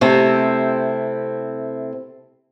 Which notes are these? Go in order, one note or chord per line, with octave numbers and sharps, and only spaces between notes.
C3 A3 C4 E4